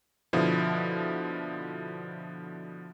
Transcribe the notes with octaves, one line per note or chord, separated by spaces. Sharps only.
B2 D3 F3 E4